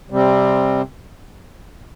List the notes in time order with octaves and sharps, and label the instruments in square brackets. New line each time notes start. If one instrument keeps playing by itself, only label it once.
[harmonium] C3 G3 C4